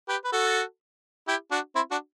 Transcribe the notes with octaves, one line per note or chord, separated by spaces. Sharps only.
G4 B4
B4
F#4 A4
E4 G4
D4 F#4
C4 E4
D4 F#4